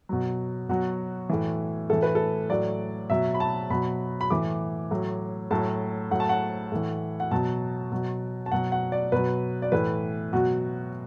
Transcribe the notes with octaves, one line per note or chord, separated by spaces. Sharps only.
B2 F#3
B2 F#3 F#4
A2 E3
A2 E3 A4
B4
A4
A2 F#3 D5
B2 F#3 E5
B5
A5
B2 F#3 B5
B5
A2 E3 D6
A2 F#3
A2 F#3 A5
A2 F#3 F#5
A5
F#5
A2 E3
F#5
B2 F#3 A5
B2 F#3
A5
B2 F#3 F#5
F#5
D5
B2 F#3 B4
D5
A2 E3 B4
B2 F#3 F#4